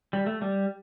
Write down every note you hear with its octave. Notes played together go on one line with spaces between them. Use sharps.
G3
A3
G3